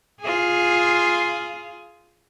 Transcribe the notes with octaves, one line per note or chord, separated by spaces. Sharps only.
F4 G#4